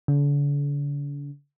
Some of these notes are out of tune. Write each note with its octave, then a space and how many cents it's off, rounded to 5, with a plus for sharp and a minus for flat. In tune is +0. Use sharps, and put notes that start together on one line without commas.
D3 -40